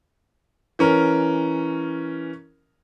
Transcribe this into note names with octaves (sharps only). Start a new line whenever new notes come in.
E3 C#4 A#4